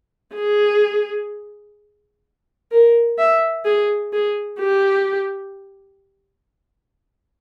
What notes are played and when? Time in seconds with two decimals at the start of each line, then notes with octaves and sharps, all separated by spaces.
0.35 G#4
2.71 A#4
3.18 E5
3.65 G#4
4.13 G#4
4.60 G4